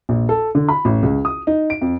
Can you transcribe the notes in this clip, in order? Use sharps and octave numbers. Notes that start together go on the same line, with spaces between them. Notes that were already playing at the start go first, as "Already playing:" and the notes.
A#1
A4
D3
B5
A1
C#2
D#6
D#4
D7
F2